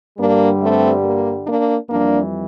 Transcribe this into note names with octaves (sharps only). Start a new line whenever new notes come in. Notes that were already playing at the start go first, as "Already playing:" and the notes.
G2 D3 G3 A#3 D4
A3 C4
A#3
A#3 D4
F2 E3 G3 A#3 D4